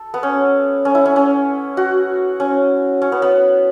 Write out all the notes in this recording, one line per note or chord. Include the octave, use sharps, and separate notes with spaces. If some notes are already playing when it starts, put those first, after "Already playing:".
Already playing: A4
B3
C#4
C#4
E4
C#4
C#4
F#4
C#4
C#4
B3
B3